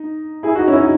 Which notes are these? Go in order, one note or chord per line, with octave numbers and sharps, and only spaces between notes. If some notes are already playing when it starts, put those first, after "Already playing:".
Already playing: D#4
E4 G#4
D#4 F#4
C#4 E4
D#4 F#4